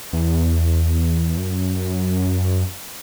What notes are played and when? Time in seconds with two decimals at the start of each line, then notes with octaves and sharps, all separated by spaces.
0.13 E2
1.37 F#2